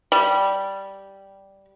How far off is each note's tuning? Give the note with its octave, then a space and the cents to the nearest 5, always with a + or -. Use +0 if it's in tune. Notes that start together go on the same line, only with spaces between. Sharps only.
G3 -5